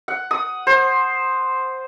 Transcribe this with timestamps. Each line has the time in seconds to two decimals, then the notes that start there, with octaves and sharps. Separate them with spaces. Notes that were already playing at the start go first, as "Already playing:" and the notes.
0.08 F#5
0.31 D#6
0.67 C5